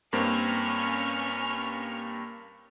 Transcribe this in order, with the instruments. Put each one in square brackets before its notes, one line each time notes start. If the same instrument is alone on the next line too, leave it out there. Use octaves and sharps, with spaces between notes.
[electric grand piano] G2 A#3 C4 [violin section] C#4 C#6 F6